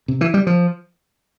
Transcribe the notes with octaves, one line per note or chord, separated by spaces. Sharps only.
C3
E3
G3
F3